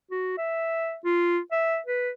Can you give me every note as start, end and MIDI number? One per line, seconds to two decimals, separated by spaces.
0.11 0.37 66
0.38 0.97 76
1.05 1.39 65
1.52 1.79 76
1.86 2.11 71